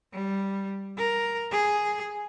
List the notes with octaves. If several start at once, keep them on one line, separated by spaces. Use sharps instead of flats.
G3
A#4
G#4